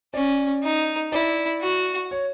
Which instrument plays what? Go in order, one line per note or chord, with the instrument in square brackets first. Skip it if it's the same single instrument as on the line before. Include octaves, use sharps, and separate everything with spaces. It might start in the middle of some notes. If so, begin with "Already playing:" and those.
[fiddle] C#4 [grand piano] D5
[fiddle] D#4
[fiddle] E4 [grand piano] D5
[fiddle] F#4
[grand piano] C#5